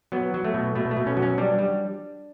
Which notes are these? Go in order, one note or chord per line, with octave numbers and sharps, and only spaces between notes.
F#3 B3
F#3
A3
B2
B2 A3
A3
B2
C#4
F#3
C#4
G3 D4
G3